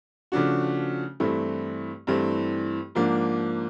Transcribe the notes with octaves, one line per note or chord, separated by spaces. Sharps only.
C#3 F3 A3 D4 F#4
G2 E3 A3 C4 E4
G2 E3 A3 C4 E4
G#2 F3 A#3 D4